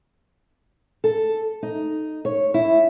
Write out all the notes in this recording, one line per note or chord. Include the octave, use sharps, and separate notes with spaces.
A4
D#4
C#5
E4